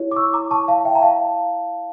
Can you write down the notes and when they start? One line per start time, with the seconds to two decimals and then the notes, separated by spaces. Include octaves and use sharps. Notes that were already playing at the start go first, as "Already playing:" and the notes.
Already playing: E4 G4 C#5
0.11 D6
0.16 C#6 E6
0.33 A#5 D6
0.51 A5 C#6
0.68 F5 A5
0.85 E5 G5
0.95 A#5
1.02 F5 A5